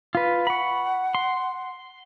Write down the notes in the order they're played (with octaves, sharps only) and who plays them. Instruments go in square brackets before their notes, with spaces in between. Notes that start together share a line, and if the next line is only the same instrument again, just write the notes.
[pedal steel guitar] F4 B4
[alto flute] F#5 [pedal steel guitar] B5 C#6
[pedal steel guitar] C6